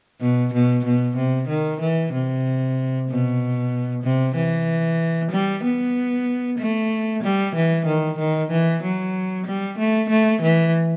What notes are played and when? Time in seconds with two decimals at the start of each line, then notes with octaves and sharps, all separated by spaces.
0.21 B2
0.53 B2
0.85 B2
1.16 C3
1.49 D#3
1.80 E3
2.13 C3
3.08 B2
4.03 C3
4.35 E3
5.32 G3
5.64 B3
6.59 A3
7.23 G3
7.55 E3
7.86 D#3
8.18 D#3
8.51 E3
8.82 F#3
9.46 G3
9.78 A3
10.10 A3
10.42 E3